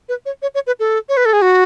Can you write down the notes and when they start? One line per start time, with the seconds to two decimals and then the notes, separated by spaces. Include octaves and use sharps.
0.09 B4
0.26 C#5
0.42 C#5
0.55 C#5
0.67 B4
0.80 A4
1.09 C#5
1.17 B4
1.25 A4
1.33 G#4
1.42 F#4